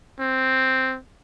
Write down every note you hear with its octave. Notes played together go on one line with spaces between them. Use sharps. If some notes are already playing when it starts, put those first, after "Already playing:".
C4